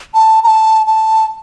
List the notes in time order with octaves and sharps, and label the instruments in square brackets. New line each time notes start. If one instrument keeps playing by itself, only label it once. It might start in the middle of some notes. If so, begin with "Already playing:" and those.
[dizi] A5
A#5
A5
A5